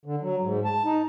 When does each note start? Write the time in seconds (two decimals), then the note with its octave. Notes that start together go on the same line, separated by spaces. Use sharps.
0.05 D3
0.22 F#3
0.43 G#2
0.64 A5
0.85 D#4